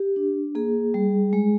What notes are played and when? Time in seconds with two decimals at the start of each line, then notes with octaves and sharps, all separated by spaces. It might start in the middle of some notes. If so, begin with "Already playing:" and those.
Already playing: G4
0.16 D4
0.55 A#3 G#4
0.94 G3
1.33 G#3